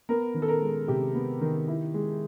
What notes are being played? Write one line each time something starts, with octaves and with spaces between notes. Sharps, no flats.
B3 A#4
D#3
A4
A#4
G#3
C3 G4
B3
D#3
E4
G#3